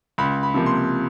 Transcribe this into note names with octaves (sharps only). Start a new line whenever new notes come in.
C#2 B5
B5
C3 F3 A#3
C6